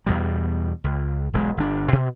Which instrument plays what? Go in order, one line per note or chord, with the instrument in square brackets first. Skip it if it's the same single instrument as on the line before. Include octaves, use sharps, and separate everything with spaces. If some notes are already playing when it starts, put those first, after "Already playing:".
[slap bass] E2 B2 G3
C#2
E1 B1 G#3
G1 D4
B2